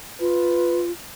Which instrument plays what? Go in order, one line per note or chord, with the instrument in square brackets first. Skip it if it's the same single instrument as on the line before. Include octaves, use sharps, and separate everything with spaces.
[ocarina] F4 [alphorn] B4